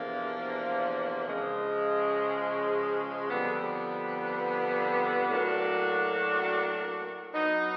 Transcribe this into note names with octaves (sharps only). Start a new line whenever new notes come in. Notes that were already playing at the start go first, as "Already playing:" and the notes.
Already playing: E2 C3 F3 A#3 D4
C#3 F3 G#3
F2 D3 G3 B3
A2 F#3 A#3 D4 F#4
F#3 B3 D#4